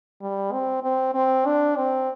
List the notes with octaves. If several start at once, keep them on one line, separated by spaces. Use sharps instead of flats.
G3
C4
C4
C4
D4
C4